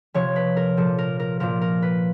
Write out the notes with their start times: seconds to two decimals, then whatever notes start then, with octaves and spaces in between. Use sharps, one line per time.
0.14 C3 F3 C#5
0.36 B4
0.57 A#4
0.77 A#2 F3 A4
0.98 A#4
1.20 A#4
1.40 A#2 F3 A#4
1.62 A#4
1.82 B4